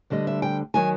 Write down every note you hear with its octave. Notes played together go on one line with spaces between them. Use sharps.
D2 D3 G3 D#5
E5
G5
D#3 F#3 G#5